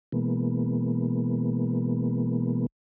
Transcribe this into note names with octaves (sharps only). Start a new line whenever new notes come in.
B2 E3 G#3 A#3 B3